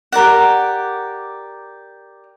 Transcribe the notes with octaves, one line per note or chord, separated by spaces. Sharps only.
G4 A#4 D5 F#5